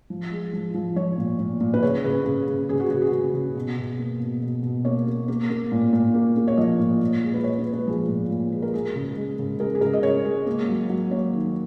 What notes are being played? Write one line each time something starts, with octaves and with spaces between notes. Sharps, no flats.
F3
G#3
F3
F3
F3 C#5
A#2
A#2
A#2
B4
C#3 C#5
C#3 B4
C#3
C#3
C#3 G#4
F#4
C#3 F#4
G#4
C#3 G#4
C#3
B2
B2
A#3
B2
B2
B2
A#3 C#5
A#3
A#3
A#3
A#2
A#2
A#3
A#3
C#5
F3 D#5
A#2
A#2
G#3
B4
G#3 C#5
B4
G#3
B4
F3 G#4
A#2
A#2
G#3
A#4
G#3 G#4
C#3
G#3
C#3
G#3 A#4
G#4
C#3 A#4
D#5
C#3 C#5
G#3
A#3
F#3
F#3
A#3 C#5
D#3